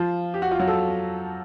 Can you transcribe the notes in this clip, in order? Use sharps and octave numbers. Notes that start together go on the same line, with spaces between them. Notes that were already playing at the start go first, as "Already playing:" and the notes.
Already playing: F3 F4
G4
F#4
F4
F#3 F#4
A4